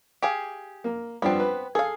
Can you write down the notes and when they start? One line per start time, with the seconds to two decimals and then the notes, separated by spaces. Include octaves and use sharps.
0.22 G4 G#4 F5
0.84 A#3
1.22 G2 F3 B3 C4 D4
1.40 B4
1.75 G#4 A4 F5